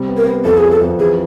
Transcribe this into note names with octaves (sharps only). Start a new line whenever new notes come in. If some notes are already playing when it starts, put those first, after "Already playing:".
Already playing: C3 G3
B3
A#4
B3
F2 A4
G#4
F2
A4
F2
E3 G#4